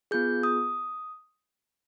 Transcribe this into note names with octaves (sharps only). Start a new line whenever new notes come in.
B3 F4 G#4 G6
D#6